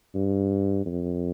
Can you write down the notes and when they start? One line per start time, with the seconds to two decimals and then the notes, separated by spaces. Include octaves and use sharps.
0.15 G2
0.86 F2